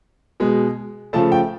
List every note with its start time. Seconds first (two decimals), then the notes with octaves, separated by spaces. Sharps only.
0.40 B2 G#3
1.13 C#3 F3 A3 A5
1.32 G5